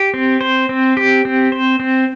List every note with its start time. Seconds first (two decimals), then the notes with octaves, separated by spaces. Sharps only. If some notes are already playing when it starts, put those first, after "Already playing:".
Already playing: G4
0.14 C4
0.41 C5
0.69 C4
0.97 G4
1.25 C4
1.52 C5
1.80 C4